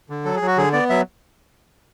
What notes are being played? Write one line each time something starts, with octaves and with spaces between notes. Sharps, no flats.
D3
F#3 A4
G#4
F#3
F#4
D3 G#4
B3 D5
F#3 E5